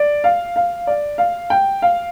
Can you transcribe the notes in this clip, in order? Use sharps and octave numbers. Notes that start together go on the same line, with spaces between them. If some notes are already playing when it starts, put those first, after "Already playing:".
Already playing: D5
F5
F5
D5
F5
G5
F5